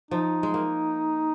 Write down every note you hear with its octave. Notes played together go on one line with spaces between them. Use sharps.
F3 D#4
G#3
A#3